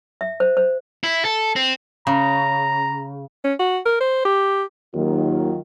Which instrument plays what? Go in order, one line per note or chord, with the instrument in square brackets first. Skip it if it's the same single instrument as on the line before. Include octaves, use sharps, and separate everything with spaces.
[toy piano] E5
C5
C5
[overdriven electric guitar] E4
A4
C4
[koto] C#3 [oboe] A#5
[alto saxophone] C#4
F#4
A#4
C5
G4
[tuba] D#2 [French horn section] D#3 F#3 F4